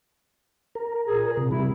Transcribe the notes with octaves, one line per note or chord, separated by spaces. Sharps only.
A#4
A#2 G#4
C3
C3 G3 E4